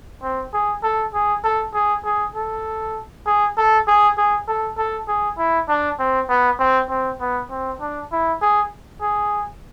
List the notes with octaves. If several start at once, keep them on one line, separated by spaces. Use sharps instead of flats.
C4
G#4
A4
G#4
A4
G#4
G#4
A4
G#4
A4
G#4
G#4
A4
A4
G#4
E4
D4
C4
B3
C4
C4
B3
C4
D4
E4
G#4
G#4